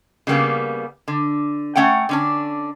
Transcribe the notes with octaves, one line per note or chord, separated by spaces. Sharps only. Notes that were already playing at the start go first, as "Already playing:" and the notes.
C#3 G3 A#3 B3
D3
A3 C#4 F#5 G5
D3 C#4 D4